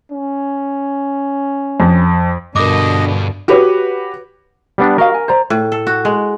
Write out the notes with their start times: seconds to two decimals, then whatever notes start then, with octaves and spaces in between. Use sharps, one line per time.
0.12 C#4
1.80 F2
2.56 G2 B2 D3 A#4 D#5 D6
3.48 F#4 G4 B4 C#5
4.78 G3 B3 D4
4.98 F#4 A#4 D#5 F5
5.14 G#5
5.28 C5 D5 A#5
5.50 A2
5.72 A4
5.87 F#4
6.05 G#3